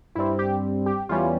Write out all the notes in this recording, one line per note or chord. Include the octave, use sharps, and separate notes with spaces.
G2 G3 C4 E4
G4
G4
E2 E3 G3 C#4 F4